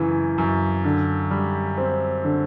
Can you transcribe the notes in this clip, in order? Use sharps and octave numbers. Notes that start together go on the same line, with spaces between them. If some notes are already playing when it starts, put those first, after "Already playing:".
Already playing: F#2 C#3 E3
F#2
D3
G3
C4
D3